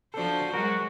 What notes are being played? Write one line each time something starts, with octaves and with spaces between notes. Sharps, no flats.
F3 D4 F#4 A4 C5
F#3 G#3 F#4 A#4